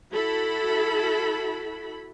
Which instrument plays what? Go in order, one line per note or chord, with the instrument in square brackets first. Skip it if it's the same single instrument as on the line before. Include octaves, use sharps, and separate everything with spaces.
[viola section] E4 F#4 A4 B5